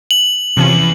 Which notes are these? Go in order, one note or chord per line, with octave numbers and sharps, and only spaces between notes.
F#7
E2 C3 F3 C#4